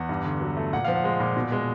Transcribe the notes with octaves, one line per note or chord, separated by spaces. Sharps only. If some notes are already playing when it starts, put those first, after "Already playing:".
Already playing: E2 F#5
G2
D3
F#3
A3
A#2 F#5
F3 F5
F#5
G#3
A#2
B2
G#3